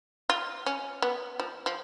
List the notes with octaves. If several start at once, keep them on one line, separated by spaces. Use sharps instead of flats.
F4
C#4
B3
F3
F3